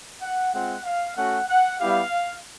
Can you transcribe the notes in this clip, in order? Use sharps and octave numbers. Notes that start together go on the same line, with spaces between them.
F#5
G#3 C4 F4 F#5
F5
A3 C#4 F#4 F#5
F#5
G3 B3 E4 G4 F5